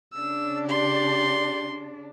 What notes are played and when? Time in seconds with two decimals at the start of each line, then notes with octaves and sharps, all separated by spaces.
0.14 C#3 D4 E6
0.69 G4 D5 C6